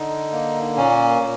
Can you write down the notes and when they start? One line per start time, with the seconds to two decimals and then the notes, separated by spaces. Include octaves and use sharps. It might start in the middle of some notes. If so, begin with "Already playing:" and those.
Already playing: D3 D#4
0.33 A#3
0.77 A#2 C#4
1.22 A#2